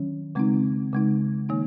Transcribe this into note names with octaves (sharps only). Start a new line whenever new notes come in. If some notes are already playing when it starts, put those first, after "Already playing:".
Already playing: D#3 F#3 C#4
C#3 G#3 C4 D#4
C#3 G#3 D#4
D#3 A#3 D#4